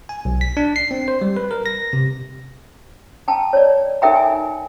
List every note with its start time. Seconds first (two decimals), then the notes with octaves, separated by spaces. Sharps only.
0.09 G#5
0.25 B1
0.41 B6
0.57 D4
0.76 C7
0.91 C4
1.08 C5
1.22 G3
1.37 B4
1.51 A#4
1.66 A#6
1.93 C3
3.28 G5 A5 A#5
3.53 C#5 D5
4.02 D#4 A4 A#4 E5 G5 A#5
4.16 G#5